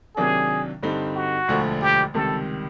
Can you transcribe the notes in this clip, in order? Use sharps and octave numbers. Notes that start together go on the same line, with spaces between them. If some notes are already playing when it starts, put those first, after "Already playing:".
C3 D#3 F#3 A#3 D4 G#4
G2 D3 G3 C4 D#4
F#4
E1 D2 D3 F3
G4
C#2 C3 D#3 G3 A4